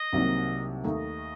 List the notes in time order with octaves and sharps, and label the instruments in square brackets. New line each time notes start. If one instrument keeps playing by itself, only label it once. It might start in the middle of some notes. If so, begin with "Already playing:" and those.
Already playing: [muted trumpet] D#5
[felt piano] C2 C3 D#3 F#3 A#3
[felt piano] D#2 D#3 A3 D#4 [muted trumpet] D#5